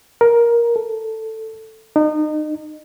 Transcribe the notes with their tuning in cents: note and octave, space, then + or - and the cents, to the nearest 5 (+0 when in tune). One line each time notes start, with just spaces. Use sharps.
A#4 +10
A4 +10
D#4 -30